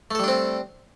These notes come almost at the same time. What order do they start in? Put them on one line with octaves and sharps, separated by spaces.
A3 A4 G3 D4 C4